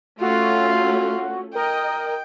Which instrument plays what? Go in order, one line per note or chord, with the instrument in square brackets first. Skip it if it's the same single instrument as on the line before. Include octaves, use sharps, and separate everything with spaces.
[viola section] A3 C#4 [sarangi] F4 [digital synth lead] F#4
[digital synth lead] A#4 [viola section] D#5 [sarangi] G5